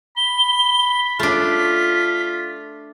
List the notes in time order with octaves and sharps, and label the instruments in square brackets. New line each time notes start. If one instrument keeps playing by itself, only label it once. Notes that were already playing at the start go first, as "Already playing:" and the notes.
[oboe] B5 [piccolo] G7
[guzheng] A3 D4 [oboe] F4 [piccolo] B6